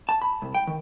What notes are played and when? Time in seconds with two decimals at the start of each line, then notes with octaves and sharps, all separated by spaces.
0.09 A5
0.22 B5
0.42 C2
0.55 G5
0.67 D#3